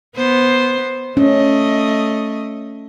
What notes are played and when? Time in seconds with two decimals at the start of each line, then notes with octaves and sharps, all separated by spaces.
0.16 B3 C5
1.17 A3 C#4 D#5